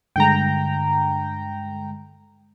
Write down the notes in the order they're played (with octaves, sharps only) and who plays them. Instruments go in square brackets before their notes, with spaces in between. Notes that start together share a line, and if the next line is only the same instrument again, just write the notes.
[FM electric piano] G2 D3 G#3 [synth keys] G5 A#5